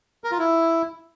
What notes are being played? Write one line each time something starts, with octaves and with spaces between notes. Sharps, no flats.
A#4
F4
E4